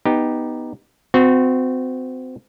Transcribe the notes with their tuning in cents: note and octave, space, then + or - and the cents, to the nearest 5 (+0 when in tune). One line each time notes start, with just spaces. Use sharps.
B3 +0 D#4 +0 G4 +5
C4 -30 F#4 -20